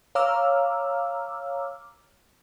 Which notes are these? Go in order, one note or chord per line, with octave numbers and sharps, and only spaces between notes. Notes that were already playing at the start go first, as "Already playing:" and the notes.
C#5 F5 A#5 D6 E6 F6